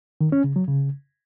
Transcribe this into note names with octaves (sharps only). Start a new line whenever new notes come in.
D#3
C#4
C#3
F#3
C#3